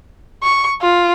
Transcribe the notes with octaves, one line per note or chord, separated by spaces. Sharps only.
C#6
F4